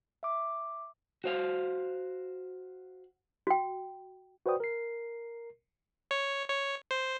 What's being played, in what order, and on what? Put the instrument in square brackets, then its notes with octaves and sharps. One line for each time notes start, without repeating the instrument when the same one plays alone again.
[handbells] E5 D6
[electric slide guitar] F#4 C5 F5
[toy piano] F#4 G5
[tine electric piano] F#4 B4 C5 D5 G5 D#6
A#4 C7
[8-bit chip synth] C#5
C#5
C5